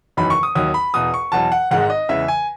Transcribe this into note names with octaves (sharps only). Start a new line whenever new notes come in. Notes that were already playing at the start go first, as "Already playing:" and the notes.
F#1 E2 D#3 F#3 B5
C#6
D#6
D#2 D#3 F#3 D#6
B5
E1 E2 B2 D#6
C#6
E2 B2 F#3 A5
F#5
G#1 G#2 D#3 G#3 F#5
D#5
E2 C#3 E3 G#3 E5
G#5